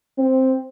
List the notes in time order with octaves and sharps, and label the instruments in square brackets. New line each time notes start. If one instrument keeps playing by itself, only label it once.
[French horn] C4